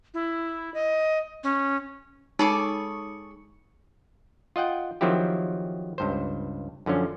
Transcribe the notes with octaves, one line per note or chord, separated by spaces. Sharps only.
E4
D#5
C#4
G#3 D#4 G#4 A4 C#6 D6 C#7
F4 D#5 F#5 G5
D#3 F3 F#3 C4 E4 G4
C#2 G2 C5
F#2 D3 F3 C#4